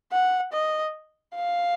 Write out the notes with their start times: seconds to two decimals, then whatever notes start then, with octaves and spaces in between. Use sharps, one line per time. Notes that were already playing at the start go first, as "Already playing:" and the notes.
0.12 F#5
0.53 D#5
1.36 F5